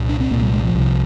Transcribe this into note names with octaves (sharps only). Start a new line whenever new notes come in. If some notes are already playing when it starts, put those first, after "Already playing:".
Already playing: C2 A#2
D4
C4
C2 A#2 A#3
G3
G#3
F3
C2 C3